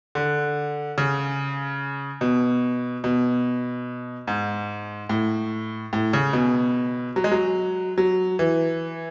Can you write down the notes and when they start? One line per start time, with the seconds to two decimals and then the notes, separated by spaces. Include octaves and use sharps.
0.15 D3
0.98 C#3
2.21 B2
3.04 B2
4.27 G#2
5.09 A2
5.93 A2
6.13 C#3
6.33 B2
7.16 F#3
7.24 G#3
7.32 F#3
7.98 F#3
8.39 E3